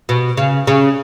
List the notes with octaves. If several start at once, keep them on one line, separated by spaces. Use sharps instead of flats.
B2
C#3
C#3